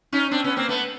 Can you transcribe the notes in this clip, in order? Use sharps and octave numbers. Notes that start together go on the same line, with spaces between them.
C#4 D#4
C4 D4
B3 C#4
A#3 C4
A3 B3